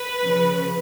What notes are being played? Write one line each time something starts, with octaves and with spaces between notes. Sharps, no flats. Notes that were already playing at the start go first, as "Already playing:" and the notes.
Already playing: B4
C#3 F3